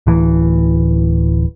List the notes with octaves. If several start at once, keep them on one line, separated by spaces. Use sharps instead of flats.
D1 E3